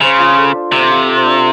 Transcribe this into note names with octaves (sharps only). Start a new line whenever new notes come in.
C#3 C5
F4
A4
D4
C3 C5
F4
A4
D4